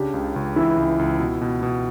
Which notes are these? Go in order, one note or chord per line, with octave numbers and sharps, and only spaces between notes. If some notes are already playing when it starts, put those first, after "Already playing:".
Already playing: C#3 D4 G4
C#2
C#2
E3 E4
C#2
C#2
B2
B2
B2